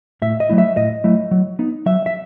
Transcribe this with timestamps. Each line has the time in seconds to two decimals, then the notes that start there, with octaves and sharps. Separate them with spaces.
0.22 A2 E5
0.40 D#5
0.49 F#3 A3 E4
0.58 E5
0.77 A2 D#5
1.04 F#3 A3 E4
1.31 F#3
1.59 B3 D#4
1.86 F#3 E5
2.06 E5